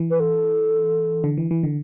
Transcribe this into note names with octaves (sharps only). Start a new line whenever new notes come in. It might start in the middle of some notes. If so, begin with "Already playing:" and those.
Already playing: E3
B4
A4
D3
E3
E3
D3